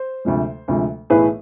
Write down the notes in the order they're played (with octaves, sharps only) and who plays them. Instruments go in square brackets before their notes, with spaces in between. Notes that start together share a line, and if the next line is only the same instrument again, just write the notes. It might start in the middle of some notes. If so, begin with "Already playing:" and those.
Already playing: [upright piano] C5
D2 C3 F3 G#3
D2 C3 F3 G#3
B1 A2 E3 A3 G#4 B4